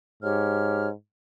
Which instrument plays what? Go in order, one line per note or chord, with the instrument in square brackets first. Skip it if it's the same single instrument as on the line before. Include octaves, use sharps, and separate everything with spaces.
[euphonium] G#2 [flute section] G4 C#5 F6